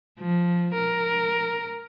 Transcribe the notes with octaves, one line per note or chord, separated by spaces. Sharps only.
F3
A#4